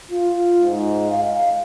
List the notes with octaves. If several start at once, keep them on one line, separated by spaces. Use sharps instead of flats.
F4
G#2
F5